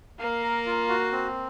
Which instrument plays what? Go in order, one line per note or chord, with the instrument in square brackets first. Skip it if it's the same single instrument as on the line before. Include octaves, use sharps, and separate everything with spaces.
[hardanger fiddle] A#3 [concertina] F5
[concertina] A#4
F4
F#4
C4